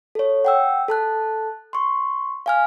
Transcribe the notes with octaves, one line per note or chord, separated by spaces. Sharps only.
A4 C#5
F#5 G5 E6
A4 A5 F#6
C6 C#6
F5 G#5 F6